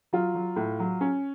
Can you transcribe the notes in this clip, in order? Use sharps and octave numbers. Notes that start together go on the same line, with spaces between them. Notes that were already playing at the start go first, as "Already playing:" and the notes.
F#3 F4
F#3
A2
F#3
C#4